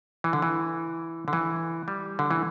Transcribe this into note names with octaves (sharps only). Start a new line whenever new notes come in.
E3
D3
E3
D3
E3
G3
D3
E3